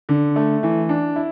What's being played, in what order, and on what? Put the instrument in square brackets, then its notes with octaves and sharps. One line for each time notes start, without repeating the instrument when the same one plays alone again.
[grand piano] D3
A3
E3
D4
E4